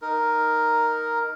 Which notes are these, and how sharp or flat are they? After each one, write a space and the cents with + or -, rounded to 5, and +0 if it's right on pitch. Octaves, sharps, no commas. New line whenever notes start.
D#4 +0 A#4 +0